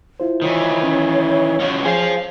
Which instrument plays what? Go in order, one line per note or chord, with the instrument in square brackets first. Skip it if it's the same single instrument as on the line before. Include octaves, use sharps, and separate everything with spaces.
[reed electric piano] E4 F4 C5
[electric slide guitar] D#3 E3 [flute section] C#5
[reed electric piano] C#4
[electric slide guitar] C#4 F4 F#4
[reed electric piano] F3 G#4 G#5 [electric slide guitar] C5 F5